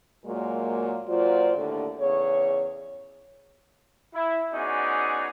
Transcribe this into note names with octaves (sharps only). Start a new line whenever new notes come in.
A#2 F#3 G#3 A#3
A#2 F#3 F4 C5 D5
D#2 A2 D3
E2 C#3 C#5
E4
B3 C#4 D#4 F#4 G#4 D5